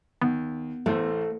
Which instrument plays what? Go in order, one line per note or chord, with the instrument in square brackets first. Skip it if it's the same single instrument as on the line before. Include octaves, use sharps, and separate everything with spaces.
[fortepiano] D#2 [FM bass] B3
[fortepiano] A1 E2 C5 [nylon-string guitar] A3